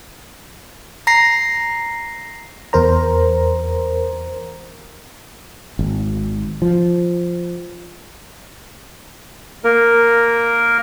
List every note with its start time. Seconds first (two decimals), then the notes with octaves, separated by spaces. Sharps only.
1.07 A#5 A#6 C7
2.73 E2 A#4 C5 A#5
5.79 G#1
6.62 F3
9.64 A#3 A#4